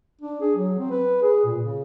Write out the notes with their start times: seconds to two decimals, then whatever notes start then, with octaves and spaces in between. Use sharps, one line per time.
0.21 D4
0.41 G#4
0.56 F#3
0.79 C4
0.91 B4
1.22 G#4
1.45 A#2
1.61 C#3